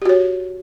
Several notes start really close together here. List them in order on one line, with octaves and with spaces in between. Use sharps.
G4 F#4 C#5